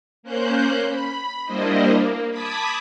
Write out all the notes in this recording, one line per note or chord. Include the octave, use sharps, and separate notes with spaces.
A#3 C#4 C5 F#6 G6
B5
G3 A#3 D4 E4 C5 D#5
A#3
A5 B5 D6 D#6 G#6 B6